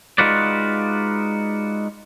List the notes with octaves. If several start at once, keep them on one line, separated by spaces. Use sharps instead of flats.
G#3 D#4 F4 F#4 B4 D5